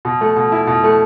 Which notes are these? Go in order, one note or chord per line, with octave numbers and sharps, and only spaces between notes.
B2
A3
B2
E4
B2
A3